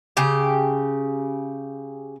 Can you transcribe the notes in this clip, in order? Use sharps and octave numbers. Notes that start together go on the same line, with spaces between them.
C#3 G4